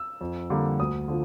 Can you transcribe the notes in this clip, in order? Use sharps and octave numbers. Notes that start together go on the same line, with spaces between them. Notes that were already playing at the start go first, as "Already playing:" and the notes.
Already playing: E6
F2
D3 G3 A#3
D2 D#6
D3 F3